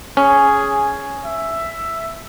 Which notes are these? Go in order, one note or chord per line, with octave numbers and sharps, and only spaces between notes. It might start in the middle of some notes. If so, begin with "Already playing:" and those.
C#4 G#4
E5